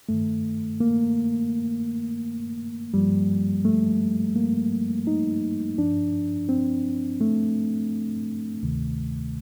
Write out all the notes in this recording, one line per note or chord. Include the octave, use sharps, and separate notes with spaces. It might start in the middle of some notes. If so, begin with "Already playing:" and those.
G2 D#3 A3
A#3
G2 F3 G3
A3
A#3
D#4
G2 F3 D4
C4
A3
D2 C3 D#3